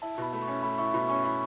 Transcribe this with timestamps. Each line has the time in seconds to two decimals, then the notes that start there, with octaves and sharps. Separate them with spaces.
0.02 E4 A5
0.18 B2 B5
0.33 A3 B5
0.42 C#6
0.48 C#4
0.63 A3 B5
0.78 E4 C#6
0.94 B2 B5
1.09 C#4 C#6
1.24 E4 B5